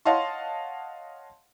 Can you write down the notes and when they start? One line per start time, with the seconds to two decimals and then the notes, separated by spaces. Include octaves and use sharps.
0.05 C#5 D#5 F5 F#5 A5 C6